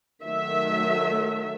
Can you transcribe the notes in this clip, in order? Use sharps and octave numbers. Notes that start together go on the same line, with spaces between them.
D#3 F#3 A3 E5